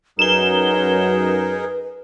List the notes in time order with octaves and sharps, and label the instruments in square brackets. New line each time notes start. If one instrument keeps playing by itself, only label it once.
[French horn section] F#2 F#3 [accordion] D#4 G#4 A#4 [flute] B4 [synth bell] E7 G7